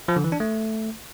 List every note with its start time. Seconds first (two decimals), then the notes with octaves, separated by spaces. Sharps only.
0.08 F3
0.16 D3
0.24 E3
0.32 D4
0.40 A3